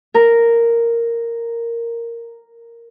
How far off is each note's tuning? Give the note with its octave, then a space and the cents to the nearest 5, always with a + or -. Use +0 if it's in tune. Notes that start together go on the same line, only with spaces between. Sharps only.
A#4 -5